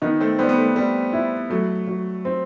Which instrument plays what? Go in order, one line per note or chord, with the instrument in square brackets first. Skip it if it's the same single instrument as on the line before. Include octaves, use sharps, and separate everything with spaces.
[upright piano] D#3 [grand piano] B3 D#4
[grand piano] A3 C4
[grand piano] G3 B3 [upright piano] C4
[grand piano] B3
A3
[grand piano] G3 [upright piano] C4
[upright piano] E4
[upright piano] F#3 [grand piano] A3
[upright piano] F#3
C4